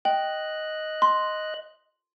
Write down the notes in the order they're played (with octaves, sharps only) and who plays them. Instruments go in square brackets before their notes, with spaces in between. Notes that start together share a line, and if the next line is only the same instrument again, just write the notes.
[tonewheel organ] D#5 F#6 [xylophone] G5
[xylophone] C6